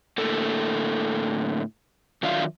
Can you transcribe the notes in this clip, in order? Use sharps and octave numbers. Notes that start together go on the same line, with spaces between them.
A2 D3 A#3 A4
D#3 F#3 D4 F4 E5 F5